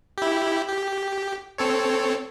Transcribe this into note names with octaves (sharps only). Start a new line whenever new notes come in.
E4 G4
G4
C4 A4 C#5